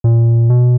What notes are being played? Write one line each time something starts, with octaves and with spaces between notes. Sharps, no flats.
A#2
B2